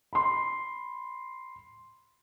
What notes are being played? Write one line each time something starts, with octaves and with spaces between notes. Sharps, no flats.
B5 C6